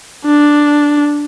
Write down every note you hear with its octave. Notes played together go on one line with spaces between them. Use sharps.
D4